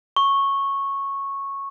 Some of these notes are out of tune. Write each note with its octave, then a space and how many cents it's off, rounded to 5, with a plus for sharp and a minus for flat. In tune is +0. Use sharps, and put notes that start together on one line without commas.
C#6 -10